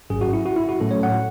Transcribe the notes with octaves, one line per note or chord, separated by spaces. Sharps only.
G#1 G#2 F#3 C#4 G#4
F#4
E4
F#4
E4
F#4
A2 F#3 A3 C#4 A4
C#5
F#5